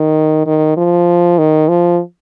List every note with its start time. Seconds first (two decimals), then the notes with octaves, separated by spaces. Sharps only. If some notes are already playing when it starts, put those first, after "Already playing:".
Already playing: D#3
0.46 D#3
0.77 F3
1.39 D#3
1.68 F3